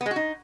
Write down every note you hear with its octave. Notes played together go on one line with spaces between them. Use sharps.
B3
G#3
F#4
D#4